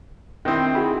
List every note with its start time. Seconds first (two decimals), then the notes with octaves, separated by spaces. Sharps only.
0.45 D#3 C4 D4 E4
0.75 F#4 G#4 B5